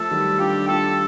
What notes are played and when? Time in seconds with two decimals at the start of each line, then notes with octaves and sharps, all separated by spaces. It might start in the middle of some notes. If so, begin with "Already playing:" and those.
Already playing: F3 A3 A4
0.11 D#3 G3
0.39 D4 F4 G4
0.68 D4 F4 A4